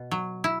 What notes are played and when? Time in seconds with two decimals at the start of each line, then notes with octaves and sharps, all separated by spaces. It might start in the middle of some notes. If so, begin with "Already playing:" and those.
Already playing: B2
0.11 F#3
0.44 E4